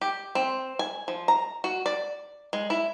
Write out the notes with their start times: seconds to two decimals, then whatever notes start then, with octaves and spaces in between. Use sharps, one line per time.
0.01 G4
0.35 C4
0.79 G#5
1.08 F3
1.28 A#5
1.64 F#4
1.86 D5
2.53 G#3
2.70 E4